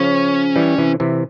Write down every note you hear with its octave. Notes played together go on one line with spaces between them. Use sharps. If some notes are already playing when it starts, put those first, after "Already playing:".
Already playing: C#3 F3 C#4
E3 G3
C3 E3
C3 E3